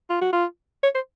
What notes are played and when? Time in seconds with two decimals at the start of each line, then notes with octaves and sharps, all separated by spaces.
0.10 F4
0.21 F#4
0.33 F4
0.83 C#5
0.95 C5